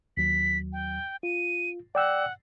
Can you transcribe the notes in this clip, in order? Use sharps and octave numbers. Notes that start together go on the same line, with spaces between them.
D#2 F#3 B6
G5
F4 D#7
D5 F#5 G5 E6